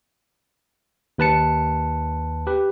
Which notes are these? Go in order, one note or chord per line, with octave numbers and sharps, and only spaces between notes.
D#2 B4 A5 C#7
G4 B4